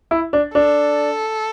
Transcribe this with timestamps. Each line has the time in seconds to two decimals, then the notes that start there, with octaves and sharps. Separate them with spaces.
0.11 E4
0.33 D4
0.55 D4 A4